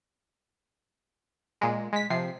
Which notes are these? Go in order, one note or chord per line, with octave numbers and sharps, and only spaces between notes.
A#2 G#3
G#3 B6
C3 F3 C7